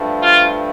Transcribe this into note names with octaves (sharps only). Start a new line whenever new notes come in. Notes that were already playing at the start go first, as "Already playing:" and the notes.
Already playing: G2 F3 A3
F4